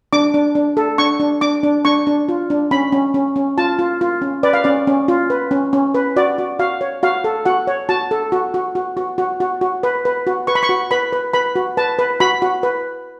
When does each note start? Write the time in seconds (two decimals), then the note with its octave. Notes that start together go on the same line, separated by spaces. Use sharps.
0.13 D4 D6
0.34 D4
0.55 D4
0.77 A4
0.98 D4 C#6
1.20 D4
1.41 D4 D6
1.63 D4
1.85 D4 C#6
2.07 D4
2.29 F4
2.50 D4
2.71 C#4 B5
2.92 C#4
3.14 C#4
3.36 C#4
3.58 F4 A5
3.79 F4
4.01 F4
4.22 C#4
4.43 B4 D5
4.53 F5
4.64 C#4 D5
4.87 C#4
5.08 F4
5.30 B4
5.51 C#4
5.73 C#4
5.95 B4
6.16 F#4 D5
6.38 F#4
6.59 F#4 F5
6.81 C#5
7.03 F#4 F5
7.24 A4
7.45 F#4 F#5
7.67 C#5
7.89 F#4 A5
8.11 A4
8.32 F#4
8.54 F#4
8.75 F#4
8.97 F#4
9.18 F#4
9.40 F#4
9.61 F#4
9.83 B4
10.05 B4
10.27 F#4
10.47 B4 C#6
10.55 B5
10.63 C#6
10.69 F#4
10.91 B4 B5
11.13 B4
11.33 B4 B5
11.56 F#4
11.77 B4 A5
11.99 B4
12.20 F#4 B5
12.42 F#4
12.63 B4